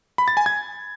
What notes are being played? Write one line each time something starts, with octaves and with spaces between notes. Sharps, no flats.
B5
A6
G#5
G#6